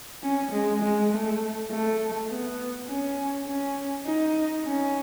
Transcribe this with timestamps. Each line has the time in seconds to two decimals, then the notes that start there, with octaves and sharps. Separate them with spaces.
0.23 C#4
0.52 G#3
0.82 G#3
1.11 A3
1.71 A3
2.29 B3
2.88 C#4
3.46 C#4
4.05 D#4
4.64 C#4